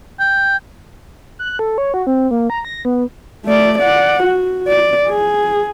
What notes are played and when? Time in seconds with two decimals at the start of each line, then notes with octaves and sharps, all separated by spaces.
0.20 G5
1.39 F#6
1.59 A4
1.78 C#5
1.94 F#4
2.07 C4
2.31 A#3
2.50 A#5
2.65 A#6
2.85 B3
3.45 A3 D5
3.78 D5 F#5
4.23 F#4
4.68 D5
5.08 G#4